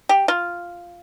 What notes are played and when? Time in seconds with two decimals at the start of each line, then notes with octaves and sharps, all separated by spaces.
0.09 G4
0.28 F4